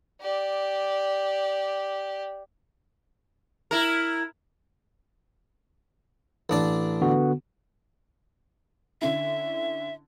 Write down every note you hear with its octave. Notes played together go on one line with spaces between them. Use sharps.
G4 D5
E4 A#4
A1 D4 D5
D3 B3 F#4
D3 C#4 E4 E5